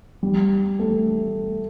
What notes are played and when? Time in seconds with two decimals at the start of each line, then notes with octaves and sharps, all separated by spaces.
0.23 G3
0.79 A3